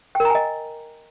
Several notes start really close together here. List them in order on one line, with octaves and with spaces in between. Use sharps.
G5 A#4 A#5 G#5 D#5